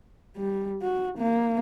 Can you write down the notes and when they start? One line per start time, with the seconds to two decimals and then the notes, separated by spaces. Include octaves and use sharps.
0.37 G3
0.82 F#4
1.18 A#3